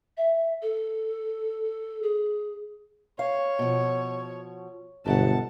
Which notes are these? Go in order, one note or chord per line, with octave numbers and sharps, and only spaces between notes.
E5
A4
G#4
C#5 F5
B2 F3
G1 F#2 B2 F#5 A5